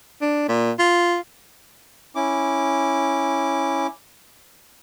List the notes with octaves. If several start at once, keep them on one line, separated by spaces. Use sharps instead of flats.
D4
A#2
F4
C#4 E4 D6